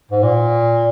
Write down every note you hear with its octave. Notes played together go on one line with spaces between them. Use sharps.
G#2
A#2